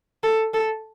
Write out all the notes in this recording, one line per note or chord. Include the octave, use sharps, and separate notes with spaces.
A4
A4